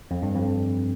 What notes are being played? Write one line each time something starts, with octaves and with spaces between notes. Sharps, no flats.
F2
G2
F2